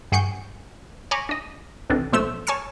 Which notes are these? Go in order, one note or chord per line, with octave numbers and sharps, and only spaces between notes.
G2 G#4 F#5 C#6 G6
C#5 G#5 A#5 B5 C#6 D6
D4 D#5
A1 C3 E3 D4 A4
B1 F3 A3 C5 E6
C#5 G#5 A5 E6 F6 C#7